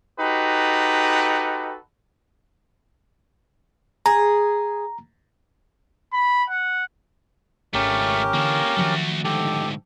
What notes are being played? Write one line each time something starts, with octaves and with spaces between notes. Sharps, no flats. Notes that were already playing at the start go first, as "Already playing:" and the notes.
D#4 F#4 G4 A4 B4
G#4 A#5
B5
F#5
G#1 C#2 A3 C#4 G4 A#4
D3 E3 A#3 A4
D#3 F3 F#3 A3 F#4
D2 G#2 G4 A4